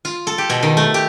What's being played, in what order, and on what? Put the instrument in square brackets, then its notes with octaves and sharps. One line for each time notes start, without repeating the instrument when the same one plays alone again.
[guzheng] F4
A4
G4
B2
D#3
A3
G4